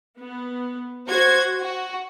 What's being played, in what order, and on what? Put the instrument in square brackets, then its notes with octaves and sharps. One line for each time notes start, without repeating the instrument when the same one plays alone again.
[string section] B3
F#4 C5 G#6
F#4